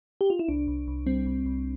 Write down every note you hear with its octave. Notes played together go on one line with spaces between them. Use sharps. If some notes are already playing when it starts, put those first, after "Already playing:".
G4
F4
E4
C2 D4
C2
C2
G3 C4
C2
C2